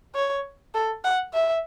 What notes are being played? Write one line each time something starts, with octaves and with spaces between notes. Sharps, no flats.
C#5
A4
F#5
E5